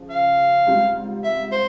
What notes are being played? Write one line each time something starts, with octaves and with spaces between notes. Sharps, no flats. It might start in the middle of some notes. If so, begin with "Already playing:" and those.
Already playing: C#3 F3
F5
G#2 G3 C4 F4
E5
C5